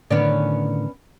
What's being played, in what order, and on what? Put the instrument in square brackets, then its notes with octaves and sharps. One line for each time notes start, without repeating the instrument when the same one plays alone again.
[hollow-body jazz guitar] A2 D3 D#3 [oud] B3 C#4 D5